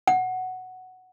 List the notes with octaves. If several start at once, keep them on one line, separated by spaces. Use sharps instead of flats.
F#5